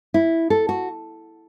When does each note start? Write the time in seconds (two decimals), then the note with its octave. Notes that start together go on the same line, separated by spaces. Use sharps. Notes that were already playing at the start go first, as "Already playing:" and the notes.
0.14 E4
0.50 A4
0.69 F#4